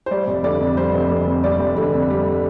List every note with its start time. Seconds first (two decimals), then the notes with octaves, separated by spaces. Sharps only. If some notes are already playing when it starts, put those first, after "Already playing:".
0.06 C5
0.11 G3 D5
0.27 F1
0.44 D3 D5
0.60 F2
0.77 G3 C5
0.94 F1
1.11 D3
1.27 F2
1.44 G3 D5
1.60 F1
1.77 D3
1.94 F2
2.10 G3